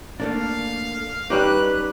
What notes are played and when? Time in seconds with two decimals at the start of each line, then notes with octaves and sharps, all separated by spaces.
0.20 A3 A#3 D4 F5
1.30 G3 C#4 D#4 G4 B4 F#6